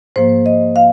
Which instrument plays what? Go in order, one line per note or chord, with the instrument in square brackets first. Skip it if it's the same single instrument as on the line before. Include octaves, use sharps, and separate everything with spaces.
[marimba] G#2 F3 A#3 C5
D#5
F5